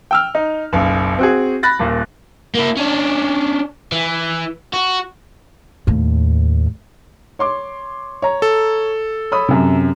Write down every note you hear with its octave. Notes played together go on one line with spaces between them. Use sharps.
G5 E6 F6
D#4
F#1 B1
C4 F#4 G#4
B5 F#6 A6 A#6
D#1 A#2
A#3 E4
C#4 D4
E3
F#4
D#2 A2
C#5 C6 D6
C#5 A#5
A4
C#5 B5 D#6
F#2 C3